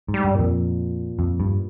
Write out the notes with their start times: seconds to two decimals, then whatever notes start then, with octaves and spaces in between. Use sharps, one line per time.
0.09 G#2
0.14 G3
0.25 G2
0.35 F2 A#2
1.19 F2
1.40 G2